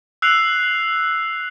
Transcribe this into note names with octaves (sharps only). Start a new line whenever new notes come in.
E6 F#6 C7 F7